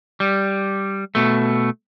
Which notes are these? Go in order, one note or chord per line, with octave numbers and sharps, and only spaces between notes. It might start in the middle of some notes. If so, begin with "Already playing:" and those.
G3
B2 A3